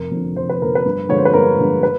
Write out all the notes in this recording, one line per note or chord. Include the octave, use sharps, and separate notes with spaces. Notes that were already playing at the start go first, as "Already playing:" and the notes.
Already playing: F1 A#4
F2 D3
F1 C5
B4
F2 D3 A#4
B4
G2
D3 F3 G#3 C#5
C5
B4
G2 A#4
D3 F3 G#3
B4